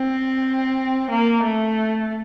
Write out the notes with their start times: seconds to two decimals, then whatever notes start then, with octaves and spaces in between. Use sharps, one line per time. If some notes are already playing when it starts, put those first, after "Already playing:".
Already playing: C4
1.11 A#3
1.44 A3